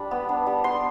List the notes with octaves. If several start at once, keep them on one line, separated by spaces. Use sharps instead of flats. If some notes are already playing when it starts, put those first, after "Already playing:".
Already playing: G3 D4 B5
B3
D4
G3
B3 C6